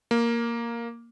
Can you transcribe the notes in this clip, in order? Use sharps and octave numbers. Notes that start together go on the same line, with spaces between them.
A#3